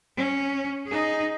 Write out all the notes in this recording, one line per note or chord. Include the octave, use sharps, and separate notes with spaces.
C#4
D#4 G#4